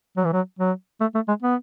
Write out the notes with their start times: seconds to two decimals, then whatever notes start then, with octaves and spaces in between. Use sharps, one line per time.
0.17 F#3
0.25 E3
0.33 F#3
0.59 F#3
1.01 A3
1.15 A3
1.28 G#3
1.43 B3